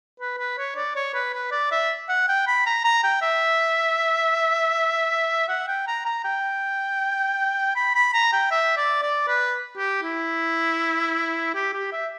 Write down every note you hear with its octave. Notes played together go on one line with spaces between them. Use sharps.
B4
B4
C#5
D5
C#5
B4
B4
D5
E5
F#5
G5
B5
A#5
A#5
G5
E5
F#5
G5
A#5
A#5
G5
B5
B5
A#5
G5
E5
D5
D5
B4
G4
E4
G4
G4
E5